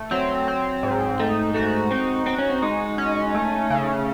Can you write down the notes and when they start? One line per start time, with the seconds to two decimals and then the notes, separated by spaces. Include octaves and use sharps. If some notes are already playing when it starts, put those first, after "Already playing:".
Already playing: A3
0.11 F#3 C4
0.48 C4
0.83 G#2
1.19 A3 D#4
1.54 A3 F#4
1.91 C4 D#4
2.26 C4 F#4
2.38 C#4
2.50 C4
2.62 G#3 D#4
2.98 C#4
3.35 A3
3.70 C#3